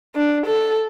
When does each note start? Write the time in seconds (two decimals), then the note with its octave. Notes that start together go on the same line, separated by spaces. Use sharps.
0.15 D4
0.46 A4